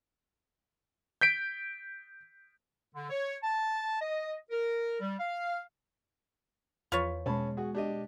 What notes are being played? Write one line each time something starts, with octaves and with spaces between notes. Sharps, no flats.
G6 B6 D7
D3
C#5
A5
D#5
A#4
G3
F5
E2 F3 F4 B4 C#5
B2 G#3 C#4 A5 B5
F#4 G#4
D4 G4 D#5